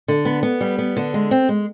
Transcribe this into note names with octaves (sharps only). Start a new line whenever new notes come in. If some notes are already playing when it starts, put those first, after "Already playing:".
D3
B3
B3
G3
B3
D3
G#3
C4
G#3